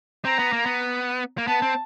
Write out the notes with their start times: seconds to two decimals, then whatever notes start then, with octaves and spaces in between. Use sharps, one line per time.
0.25 C4 A#5
0.39 B3
0.53 A#3
0.66 B3
1.38 A#3
1.47 B3 A5
1.62 C4